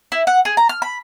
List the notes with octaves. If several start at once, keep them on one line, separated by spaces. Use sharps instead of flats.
E4
F#5
G#4
A#5
F6
B5